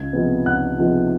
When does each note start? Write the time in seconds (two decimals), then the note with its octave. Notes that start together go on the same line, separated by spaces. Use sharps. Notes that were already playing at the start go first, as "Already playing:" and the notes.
Already playing: C#2 G#6
0.13 C3 F3 G#3 B3
0.45 C#2 F#5 F#6
0.78 C3 F3 G#3 B3